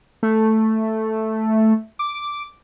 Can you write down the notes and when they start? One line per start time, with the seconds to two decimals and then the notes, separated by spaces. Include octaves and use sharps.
0.23 A3
1.99 D6